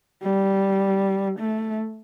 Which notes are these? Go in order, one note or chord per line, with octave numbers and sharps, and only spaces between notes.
G3
A3